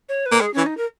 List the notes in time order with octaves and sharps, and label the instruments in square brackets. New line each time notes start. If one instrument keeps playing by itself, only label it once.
[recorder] C#5
B4
[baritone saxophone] A#3
[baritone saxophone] G#3 [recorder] G#4
[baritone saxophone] E3 [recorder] C#4
[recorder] D#4
A#4